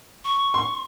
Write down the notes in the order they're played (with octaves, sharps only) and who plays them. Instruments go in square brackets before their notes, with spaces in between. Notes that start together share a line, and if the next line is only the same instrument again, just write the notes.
[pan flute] C#6
[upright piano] C6